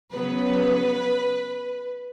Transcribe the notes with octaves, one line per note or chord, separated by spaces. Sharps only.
C#3 F#3 B3 B4